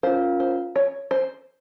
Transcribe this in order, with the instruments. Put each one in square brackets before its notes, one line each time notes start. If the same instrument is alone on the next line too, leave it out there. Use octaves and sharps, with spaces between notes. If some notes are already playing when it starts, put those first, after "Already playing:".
[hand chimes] C#4 F4 A#4 F5 [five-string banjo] C5
[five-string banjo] C5
C#5
C5